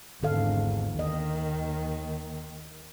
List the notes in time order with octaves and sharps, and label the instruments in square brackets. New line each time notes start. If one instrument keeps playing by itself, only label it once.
[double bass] G#1 E2 [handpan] D3 A4 F5
[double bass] D#2 D#3 [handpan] D#5